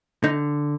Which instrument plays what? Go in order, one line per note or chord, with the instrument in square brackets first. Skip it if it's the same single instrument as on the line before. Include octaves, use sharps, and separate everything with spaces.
[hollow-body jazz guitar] D3 D#4